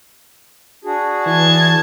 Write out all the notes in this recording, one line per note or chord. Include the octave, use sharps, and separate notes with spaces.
D4 F#4 G#4
E3 A5 G#6